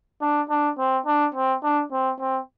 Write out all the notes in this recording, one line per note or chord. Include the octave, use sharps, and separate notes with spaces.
D4
D4
C4
D4
C4
D4
C4
C4